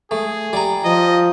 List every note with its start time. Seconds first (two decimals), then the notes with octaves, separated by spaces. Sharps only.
0.11 A3 G#4
0.53 G3 A#5
0.84 F3 D#5